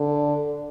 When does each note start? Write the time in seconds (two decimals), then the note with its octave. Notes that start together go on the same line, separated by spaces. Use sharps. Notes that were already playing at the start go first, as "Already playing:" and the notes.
Already playing: D3